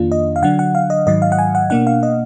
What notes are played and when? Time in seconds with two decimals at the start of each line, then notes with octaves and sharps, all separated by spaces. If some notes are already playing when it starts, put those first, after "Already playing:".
Already playing: F2 D#3 A#3 D4 F4
0.12 D#5
0.36 F5
0.42 D3 F#3 D4 F#5
0.59 F#5
0.75 F5
0.90 D#5
1.07 G#2 D#3 F#3 D#5
1.22 F5
1.32 F#5
1.39 G#5
1.55 F#5
1.70 B2 A#3 D4 F#5
1.87 F5
2.03 D#5